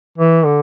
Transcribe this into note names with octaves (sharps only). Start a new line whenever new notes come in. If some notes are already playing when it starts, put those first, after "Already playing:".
E3
D3